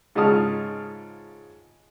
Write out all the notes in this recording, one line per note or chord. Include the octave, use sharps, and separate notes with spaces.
G#2 C#3 F4 A5 D#6 F6